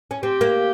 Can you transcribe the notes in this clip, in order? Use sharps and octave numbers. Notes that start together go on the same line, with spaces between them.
C#4
C4 G4
A#3